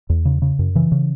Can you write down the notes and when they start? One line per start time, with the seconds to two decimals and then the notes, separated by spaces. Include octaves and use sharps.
0.10 E2
0.25 C#3
0.42 C#3
0.59 F#2
0.75 C#3 E3
0.92 C#3